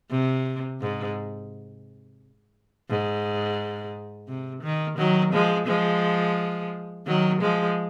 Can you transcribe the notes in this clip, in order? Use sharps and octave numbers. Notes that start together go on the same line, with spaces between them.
C3
G#2
G#2
C3
D#3
D#3 F#3
F3 G#3
F3 G#3
D#3 F#3
F3 G#3